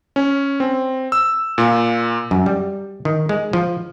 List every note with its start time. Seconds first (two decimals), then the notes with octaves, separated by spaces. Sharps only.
0.16 C#4
0.60 C4
1.12 E6
1.58 A#2
2.31 F#2
2.46 G3
3.05 D#3
3.29 G#3
3.53 F3